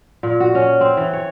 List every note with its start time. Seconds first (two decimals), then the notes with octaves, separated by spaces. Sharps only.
0.23 A#2
0.40 F#4
0.55 C#4
0.81 C4
0.97 E3
1.13 C#5